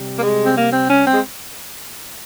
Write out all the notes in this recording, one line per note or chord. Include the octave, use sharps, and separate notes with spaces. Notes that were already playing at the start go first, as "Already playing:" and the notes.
Already playing: C3 G3
A#3
G#3
C4
A#3
C4
C#4
C4
G#3